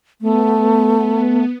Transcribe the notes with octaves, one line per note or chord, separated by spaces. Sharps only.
A3 B3